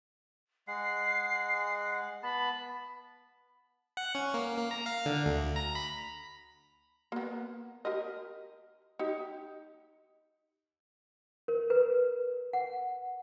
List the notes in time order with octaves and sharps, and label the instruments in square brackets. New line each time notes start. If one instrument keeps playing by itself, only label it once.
[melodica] G#3 F#5 [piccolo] C7
[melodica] B3 A5 [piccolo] B5
[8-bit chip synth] F#5
C#4
A#3
A#3
A#5
F5
D3
D2
A#5
B5
[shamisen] A#3 B3
G4 A#4 D#5
D#4 G4
[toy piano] A#4
B4
F#5